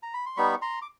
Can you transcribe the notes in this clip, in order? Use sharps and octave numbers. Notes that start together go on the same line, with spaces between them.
A#5
B5
C6
G3 B3 D#4 B5 C#6
A#5 C6
D6